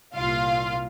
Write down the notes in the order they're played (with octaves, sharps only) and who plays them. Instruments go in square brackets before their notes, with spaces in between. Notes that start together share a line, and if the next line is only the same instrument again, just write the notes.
[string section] C2 A#2 F4 F5